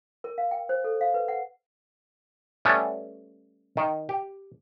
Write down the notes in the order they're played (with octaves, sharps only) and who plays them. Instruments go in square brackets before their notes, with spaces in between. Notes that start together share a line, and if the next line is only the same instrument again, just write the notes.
[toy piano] A#4
F5
G5
C5
A4
F5
B4
F#5
[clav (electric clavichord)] G3 A3 B3 C#4
D#3
G4